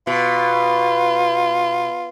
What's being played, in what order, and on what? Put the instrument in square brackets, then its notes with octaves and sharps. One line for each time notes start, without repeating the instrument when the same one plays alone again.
[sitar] B2 [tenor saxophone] F4